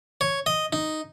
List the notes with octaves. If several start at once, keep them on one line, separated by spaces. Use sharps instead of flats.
C#5
D#5
D#4